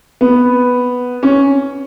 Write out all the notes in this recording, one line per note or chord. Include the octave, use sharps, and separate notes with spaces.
B3
C#4